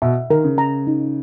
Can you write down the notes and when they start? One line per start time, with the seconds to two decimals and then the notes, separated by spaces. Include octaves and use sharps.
0.02 B2 E5
0.30 D#3 A#4
0.44 C#3
0.58 A#5
0.87 D#4